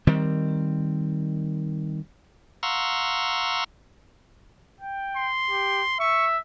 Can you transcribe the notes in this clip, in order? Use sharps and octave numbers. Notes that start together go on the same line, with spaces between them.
D#3 G3 C4
F5 F#5 A#5 C6 C#6 E6
G5
C6
G4
E5 C#6